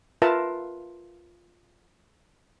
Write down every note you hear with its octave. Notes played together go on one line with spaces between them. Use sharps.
F4 A#4 B4 E5 A5